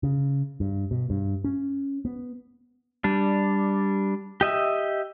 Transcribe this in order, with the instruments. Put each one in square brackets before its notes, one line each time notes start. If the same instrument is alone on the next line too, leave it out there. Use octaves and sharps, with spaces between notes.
[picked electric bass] C#3
G2
B2
G2
C#4
B3
[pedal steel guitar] G3 D4
G4 D#5 E5